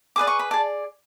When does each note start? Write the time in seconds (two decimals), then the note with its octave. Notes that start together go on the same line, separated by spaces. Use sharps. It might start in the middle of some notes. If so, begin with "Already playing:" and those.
0.16 G#4 B4 D5 D6
0.27 C#6
0.39 B5
0.51 G#4 D5 A5